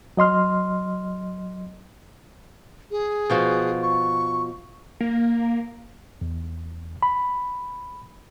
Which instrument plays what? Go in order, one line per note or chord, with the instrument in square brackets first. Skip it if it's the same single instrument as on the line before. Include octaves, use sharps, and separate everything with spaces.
[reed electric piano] F#3 D#5 C6 F6
[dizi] G#4
[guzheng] B2 F3 F#4
[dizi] C#6
[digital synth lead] A#3
[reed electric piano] E2
B5